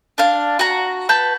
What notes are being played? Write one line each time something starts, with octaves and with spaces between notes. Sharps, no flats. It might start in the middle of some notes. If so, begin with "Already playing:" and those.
D4 F5
F#4 A#5
B4 A5 G6